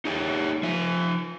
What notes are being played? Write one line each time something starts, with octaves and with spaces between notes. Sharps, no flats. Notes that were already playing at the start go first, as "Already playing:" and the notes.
D#4 G4 C#5 E5 F#5 G5
F3 E5